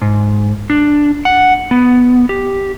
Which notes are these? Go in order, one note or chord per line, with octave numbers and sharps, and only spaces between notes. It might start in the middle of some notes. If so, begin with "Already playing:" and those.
G#2
D4
F#5
B3
G4